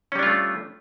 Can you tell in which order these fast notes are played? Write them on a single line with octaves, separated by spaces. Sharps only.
C#4 G3 D4 F4 A3